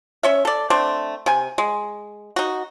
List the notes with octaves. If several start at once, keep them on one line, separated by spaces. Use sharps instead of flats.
C#4 C#5 E5
A4 D5
A3 C4 D4
C3 G#5
G#3
D#4 F#4